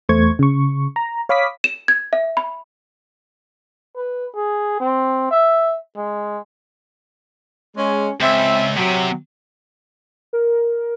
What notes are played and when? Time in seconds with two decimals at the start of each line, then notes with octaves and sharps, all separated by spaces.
0.09 E2 A3 C5 C#6 G#6
0.39 C#3 C#6
0.96 A#5
1.29 C#5 F5 B5 D6 D#6 B6
1.64 E7
1.88 G#6
2.13 E5
2.37 B5
3.96 B4
4.36 G#4
4.80 C4
5.31 E5
5.97 G#3
7.76 G#3 C#4
8.21 C#2 C4 E5
8.76 A2 C3 F#3
10.33 A#4